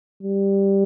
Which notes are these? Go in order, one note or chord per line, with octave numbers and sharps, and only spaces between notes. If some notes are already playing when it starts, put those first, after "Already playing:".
G3